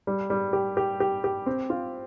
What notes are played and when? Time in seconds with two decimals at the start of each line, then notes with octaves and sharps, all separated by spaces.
0.07 G3
0.30 G3
0.53 G4
0.77 G4
1.00 G4
1.24 G4
1.46 C4
1.70 F4